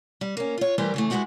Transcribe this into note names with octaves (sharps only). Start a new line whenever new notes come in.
G3
A#3 C#4
F4 C#5
E3 G3 A3 G4 A#4 C5
C#3 E3 A3
G2 G#3 B3 E4 F#4 G4